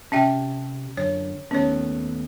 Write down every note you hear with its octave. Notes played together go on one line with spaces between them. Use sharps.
C3 C#4 G4 E5 G5 A5
F#2 D3 C#5
D#2 A3 B3 C#4 C#5